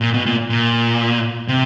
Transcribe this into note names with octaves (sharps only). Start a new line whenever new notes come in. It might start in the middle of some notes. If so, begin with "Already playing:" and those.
A#2
B2
A#2
A#2
C3